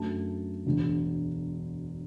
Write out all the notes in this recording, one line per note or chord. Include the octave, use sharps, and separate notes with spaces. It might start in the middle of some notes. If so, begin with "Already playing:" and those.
Already playing: F#2 D3 F#3 A3 A5
E1 D2 D3 G#3